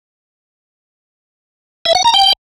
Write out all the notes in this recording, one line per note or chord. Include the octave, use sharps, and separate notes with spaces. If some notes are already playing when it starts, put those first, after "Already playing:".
E5
F#5
A#5
G5